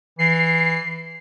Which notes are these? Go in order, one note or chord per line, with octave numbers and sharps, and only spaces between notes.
E3 C7